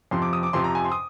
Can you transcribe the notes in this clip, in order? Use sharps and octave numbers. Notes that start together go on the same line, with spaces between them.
F2 C3 F3 C6
D6
D#6
D6
F2 C3 F3 C6
A#5
G#5
C6
D#6